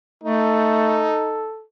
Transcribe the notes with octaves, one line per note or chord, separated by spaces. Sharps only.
A3 D#4 A4